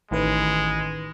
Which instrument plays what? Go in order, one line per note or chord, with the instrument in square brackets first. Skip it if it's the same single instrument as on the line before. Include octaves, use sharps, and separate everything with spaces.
[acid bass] A1 [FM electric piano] A2 D#3 B4 [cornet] G#3